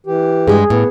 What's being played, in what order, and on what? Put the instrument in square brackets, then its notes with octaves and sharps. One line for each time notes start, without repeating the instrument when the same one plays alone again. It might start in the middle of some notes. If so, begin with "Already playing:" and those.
[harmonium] E3 G4
[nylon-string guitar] G2 G#3 [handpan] G#4
[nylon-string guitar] A2 [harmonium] B3